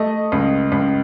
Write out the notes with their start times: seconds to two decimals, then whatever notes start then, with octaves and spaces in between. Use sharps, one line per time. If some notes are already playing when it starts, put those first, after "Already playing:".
Already playing: A3 D#5
0.32 C#2
0.72 C#2